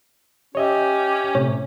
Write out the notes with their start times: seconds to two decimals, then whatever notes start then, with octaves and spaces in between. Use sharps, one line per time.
0.55 C#4 G4 C#5 D#5 E5
1.35 A2 C3 C#5